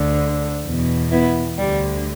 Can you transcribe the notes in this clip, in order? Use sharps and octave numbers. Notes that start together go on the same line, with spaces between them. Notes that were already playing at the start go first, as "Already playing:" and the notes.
Already playing: D2 D3
E2 B2
B3 E4
D2 D3 G3